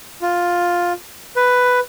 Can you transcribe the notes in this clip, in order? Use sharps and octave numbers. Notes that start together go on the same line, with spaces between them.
F4
B4